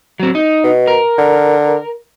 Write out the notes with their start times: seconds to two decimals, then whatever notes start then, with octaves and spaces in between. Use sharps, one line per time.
0.20 F#3 C4
0.35 D#4
0.64 B2
0.87 A#4
1.18 D3